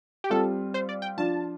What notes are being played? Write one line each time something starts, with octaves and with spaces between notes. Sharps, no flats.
G4
G3 C4 F4 A4
C5
D5
G5
F3 D4 F4 A5